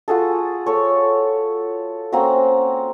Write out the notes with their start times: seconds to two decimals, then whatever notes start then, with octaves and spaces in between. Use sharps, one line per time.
0.08 F4 F#4 G#4 A4
0.66 A4 C#5
2.12 A#3 C4 C#4 F#4